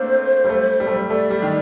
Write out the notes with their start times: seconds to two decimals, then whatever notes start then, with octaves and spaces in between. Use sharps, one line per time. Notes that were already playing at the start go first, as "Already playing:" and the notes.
Already playing: A3 A#3 C4 D4 C5
0.44 G3
0.49 A3
0.80 G3
0.87 A3
0.95 G3
1.10 A3 D5
1.30 G3
1.42 D#3